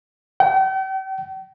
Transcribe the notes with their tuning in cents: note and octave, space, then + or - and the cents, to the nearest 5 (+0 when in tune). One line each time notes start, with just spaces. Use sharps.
G5 -40